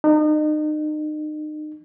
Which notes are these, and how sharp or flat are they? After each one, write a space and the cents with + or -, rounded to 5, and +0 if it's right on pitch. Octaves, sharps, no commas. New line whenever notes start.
D#4 -35